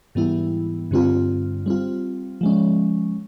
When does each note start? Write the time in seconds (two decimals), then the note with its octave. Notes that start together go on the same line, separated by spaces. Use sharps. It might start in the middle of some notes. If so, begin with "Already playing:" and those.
0.15 G#2 E3 G3 B3 E4
0.91 G2 D3 G3 C4 F4
1.66 G3 C4 F4
2.41 F3 G#3 C#4